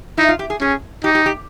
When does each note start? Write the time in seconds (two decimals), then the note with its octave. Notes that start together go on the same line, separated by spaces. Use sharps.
0.18 D#4 E4
0.29 F4
0.39 G4
0.50 G#4
0.61 C#4 G#4
1.04 D#4 G4
1.15 G4
1.26 G4